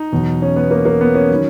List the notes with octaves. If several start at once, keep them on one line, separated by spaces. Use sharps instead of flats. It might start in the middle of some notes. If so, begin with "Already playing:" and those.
Already playing: D#4
E2 B2 F#3
C#4
B3
A#3
A#3
B3
C#4
D#3 F#3